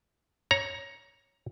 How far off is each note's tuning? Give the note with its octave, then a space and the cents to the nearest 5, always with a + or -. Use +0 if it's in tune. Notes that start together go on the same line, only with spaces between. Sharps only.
C#5 +0 A#5 +15